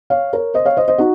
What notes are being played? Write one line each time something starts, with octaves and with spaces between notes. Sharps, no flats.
C#5 F5
A#4 C#5
C5 D#5
C#5 F5
C5 D#5
C5 D#5
D#4 F#4